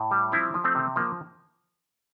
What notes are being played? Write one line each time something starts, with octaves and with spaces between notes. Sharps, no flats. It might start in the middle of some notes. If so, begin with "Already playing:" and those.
Already playing: A2
G3
F3 C4 E4
F3
A3 C4
C3
F3 A#3